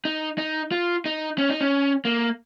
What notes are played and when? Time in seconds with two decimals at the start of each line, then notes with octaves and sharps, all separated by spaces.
0.05 D#4
0.38 D#4
0.72 F4
1.05 D#4
1.38 C#4
1.49 D#4
1.61 C#4
2.05 A#3